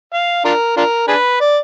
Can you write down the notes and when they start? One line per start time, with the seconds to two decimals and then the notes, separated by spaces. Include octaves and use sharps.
0.14 F5
0.45 D4 F4 A#4
0.77 D4 F4 A#4
1.08 D4 G#4 B4
1.41 D5